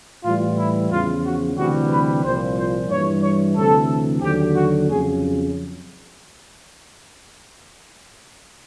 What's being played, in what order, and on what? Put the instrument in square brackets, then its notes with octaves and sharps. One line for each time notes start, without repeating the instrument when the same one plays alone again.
[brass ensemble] A2 E3 G3 F4
E4
E2 C#3 F3 F4
F#4
D2 C3 E3 G3 F#4
B4
C2 A#2 F3 C5
C5
G2 E3 G3 C#5
C#5
D2 C3 E3 A4
D#2 D3 F#3 G4
F#4
F2 C#3 F#3 G#4